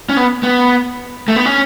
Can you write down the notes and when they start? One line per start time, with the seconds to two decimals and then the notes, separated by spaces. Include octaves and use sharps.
0.09 C#4
0.17 B3
0.43 B3
1.28 A3
1.36 B3
1.45 C#4